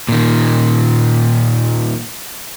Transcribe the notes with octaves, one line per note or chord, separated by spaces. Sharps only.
A#2 D#3